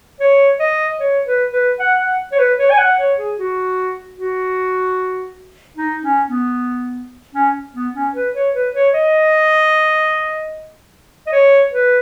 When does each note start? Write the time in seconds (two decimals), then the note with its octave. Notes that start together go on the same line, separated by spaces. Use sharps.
0.20 C#5
0.60 D#5
1.00 C#5
1.26 B4
1.53 B4
1.79 F#5
1.99 F#5
2.32 C#5
2.39 B4
2.59 C#5
2.71 G#5
2.78 F#5
2.98 C#5
3.18 G#4
3.39 F#4
4.17 F#4
5.77 D#4
6.03 C#4
6.29 B3
7.35 C#4
7.74 B3
7.95 C#4
8.15 B4
8.34 C#5
8.54 B4
8.74 C#5
8.94 D#5
11.27 D#5
11.32 C#5
11.72 B4